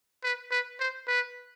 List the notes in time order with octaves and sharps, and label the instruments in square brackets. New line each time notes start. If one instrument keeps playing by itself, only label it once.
[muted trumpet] B4
B4
C5
B4